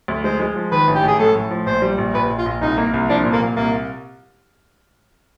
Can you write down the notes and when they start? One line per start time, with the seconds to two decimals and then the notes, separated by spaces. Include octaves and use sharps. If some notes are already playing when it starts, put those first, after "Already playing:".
0.08 D2
0.24 G#3 C5
0.40 G#3
0.56 F3
0.72 D#3 B4
0.87 A1
0.95 G4
1.03 A1 G#4
1.19 A2 A4
1.36 A2
1.51 F3
1.66 A#1 C5
1.82 G3
1.98 A#1
2.14 A#1 B4
2.30 A#1
2.38 F4
2.46 A#1
2.61 C2 D#4
2.78 A#3
2.94 C2
3.09 F3 D4
3.24 A#2
3.33 A#3
3.41 A#2
3.56 C2 A#3